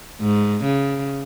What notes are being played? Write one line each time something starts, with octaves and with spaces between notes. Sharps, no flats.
G#2
C#3